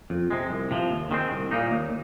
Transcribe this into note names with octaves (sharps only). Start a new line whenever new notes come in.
F2
C3 G#3
C2
C3 F3
D#2
D#3 G#3 C4
C2
A#2 A#3 D#4
D#2